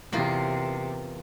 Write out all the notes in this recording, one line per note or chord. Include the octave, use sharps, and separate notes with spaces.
E2 C3 A#3 F4